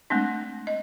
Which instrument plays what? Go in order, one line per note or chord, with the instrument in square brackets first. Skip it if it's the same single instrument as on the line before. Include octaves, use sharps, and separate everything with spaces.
[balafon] G#3 A3 C4 D4
D#5